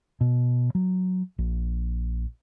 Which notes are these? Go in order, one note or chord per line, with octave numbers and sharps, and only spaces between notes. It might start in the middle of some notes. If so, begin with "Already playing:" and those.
B2
F#3
A#1